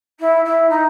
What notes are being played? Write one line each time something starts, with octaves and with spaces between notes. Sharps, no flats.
E4
E4
D#4